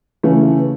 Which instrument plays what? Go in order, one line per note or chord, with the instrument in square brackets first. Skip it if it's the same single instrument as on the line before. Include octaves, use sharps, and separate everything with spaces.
[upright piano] C#3 E3 A3 C#4